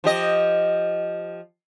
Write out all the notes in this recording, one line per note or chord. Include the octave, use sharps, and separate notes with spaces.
F3 G4 D#5